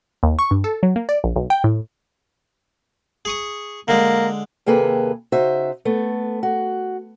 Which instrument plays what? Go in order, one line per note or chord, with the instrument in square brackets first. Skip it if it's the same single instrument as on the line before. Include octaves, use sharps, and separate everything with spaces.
[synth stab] D#2
C#6
G2
A4
F#3
A#3
D5
A#1
B1
G5
A2
[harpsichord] G#4 C#6 D#6
[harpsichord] D3 G#3 [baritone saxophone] A#3
[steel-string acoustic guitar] D#2 C3 A#3 G#4 A4 B4
C#3 D#4 F#4 C5 E5
A3 B3
F#4